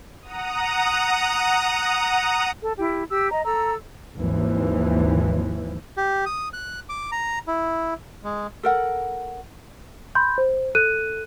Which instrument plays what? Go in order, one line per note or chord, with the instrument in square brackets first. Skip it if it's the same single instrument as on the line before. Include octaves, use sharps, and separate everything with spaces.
[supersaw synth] F#5 A#5 D#6
[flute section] A4
E4 G4
G4 E6
D#5 A#5
A4 A#5 E6
[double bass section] G#1 D#2 E3 F3
[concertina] G4
D#6
F#6
D6
A#5
E4
G#3
[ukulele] A4 A#4 F#5
[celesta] B5 C6 G6
C5
A4 F#6 D#7